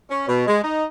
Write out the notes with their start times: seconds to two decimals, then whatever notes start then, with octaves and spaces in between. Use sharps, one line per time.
0.11 C#4
0.28 B2
0.47 G#3
0.64 D#4